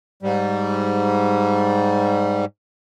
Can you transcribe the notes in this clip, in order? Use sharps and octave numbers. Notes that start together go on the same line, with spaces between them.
G#2 G3